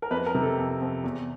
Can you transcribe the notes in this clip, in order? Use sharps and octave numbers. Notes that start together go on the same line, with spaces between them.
A#4
F2 B4
A#4
C3
A4
F2
F2
E2